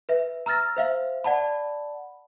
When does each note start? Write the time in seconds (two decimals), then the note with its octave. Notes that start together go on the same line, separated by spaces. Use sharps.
0.09 B4 E5
0.46 A#5 E6 F6 A6 A#6
0.77 C5 E5 F5
1.24 D5 F#5 A5 B5